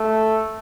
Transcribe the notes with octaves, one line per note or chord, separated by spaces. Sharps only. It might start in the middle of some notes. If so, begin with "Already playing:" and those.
Already playing: A3